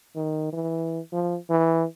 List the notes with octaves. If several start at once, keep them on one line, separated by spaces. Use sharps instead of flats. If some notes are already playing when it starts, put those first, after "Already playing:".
D#3
E3
F3
E3